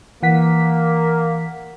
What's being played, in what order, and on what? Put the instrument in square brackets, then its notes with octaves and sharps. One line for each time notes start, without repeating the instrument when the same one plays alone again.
[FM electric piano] E3 F#5 B6 [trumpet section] A#3